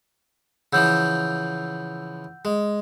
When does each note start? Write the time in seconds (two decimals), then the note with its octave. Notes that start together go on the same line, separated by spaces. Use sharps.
0.73 C#3 E3 F3 F#5 E6 G6
2.45 G#3